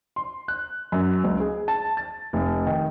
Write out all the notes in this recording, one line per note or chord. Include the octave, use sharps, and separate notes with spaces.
C6
F#6
F#2
C#2
G#4
A5
A6
F1
D#3